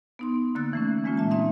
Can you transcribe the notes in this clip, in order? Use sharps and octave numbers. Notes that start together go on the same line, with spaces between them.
B3 D#4 C6
D3 A#3 E6 F#6 A6
E3 A3 C#4
E3 G#3 A#3 C#4 F4
A#2 E5 A5
A#3 C4 D#4 E5